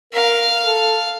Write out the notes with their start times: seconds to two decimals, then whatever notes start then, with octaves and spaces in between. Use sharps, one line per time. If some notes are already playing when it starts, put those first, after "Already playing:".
0.13 A#4 F5
0.63 A4